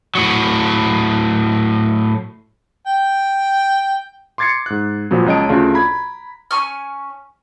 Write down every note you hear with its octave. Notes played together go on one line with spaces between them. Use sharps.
A2 F#3
G5
C6 D6 G#6 A6 C7 C#7
G#2 F#6
A#2 F3 F#3 B3
C#2 C#5 D#5 A5 D7
D2 C#3 A3 D4 F4
A#5 B5 G#6
C#4 G#5 C#6 F6